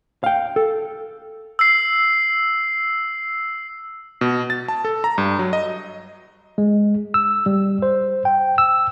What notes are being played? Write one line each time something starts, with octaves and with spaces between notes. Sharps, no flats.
F5 G5
A4
E6 C7
B2
A6
A5
A4
A#5
G2
F#3
D#5
G#3
E6
G3
C5
G5
E6